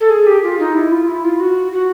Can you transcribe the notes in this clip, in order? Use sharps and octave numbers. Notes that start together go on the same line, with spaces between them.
A4
G#4
G4
F4
D#4
E4
F4
E4
F4
F#4
F#4